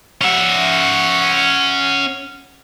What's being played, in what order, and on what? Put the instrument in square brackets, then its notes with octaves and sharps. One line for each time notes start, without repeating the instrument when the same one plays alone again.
[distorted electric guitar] C#4 E5 [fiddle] F#5